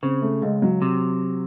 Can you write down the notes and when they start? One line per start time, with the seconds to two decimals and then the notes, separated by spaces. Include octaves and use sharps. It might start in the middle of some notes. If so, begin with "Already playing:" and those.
0.02 C#3 C4
0.22 A3
0.42 C#2 G#3
0.62 F#3
0.82 C3